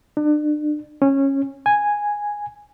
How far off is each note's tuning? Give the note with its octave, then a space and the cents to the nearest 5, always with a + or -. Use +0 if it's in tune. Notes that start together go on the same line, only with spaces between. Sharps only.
D4 +35
C#4 -15
G#5 -5